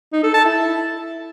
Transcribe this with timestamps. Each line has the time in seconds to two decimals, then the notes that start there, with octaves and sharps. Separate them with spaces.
0.13 D#4
0.23 A4
0.34 A5
0.45 E4